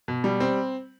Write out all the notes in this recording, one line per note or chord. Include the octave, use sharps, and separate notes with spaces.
B2
G3
C4